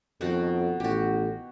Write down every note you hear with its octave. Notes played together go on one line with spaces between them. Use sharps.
F2 B2 D#3 F#4
A1 F#4 G4